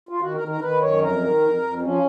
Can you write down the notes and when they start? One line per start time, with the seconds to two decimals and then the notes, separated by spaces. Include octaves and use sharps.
0.09 F4
0.21 D#3 F#4
0.34 A#4
0.41 D#3
0.48 A#4
0.61 D#3 B4
0.82 F#2 C#5
1.02 F2 A#4
1.22 D#3
1.41 F2
1.62 F2
1.81 F3 C#4